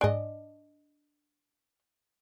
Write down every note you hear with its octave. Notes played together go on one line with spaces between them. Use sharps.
G#2 D4 D#5 G#5 D7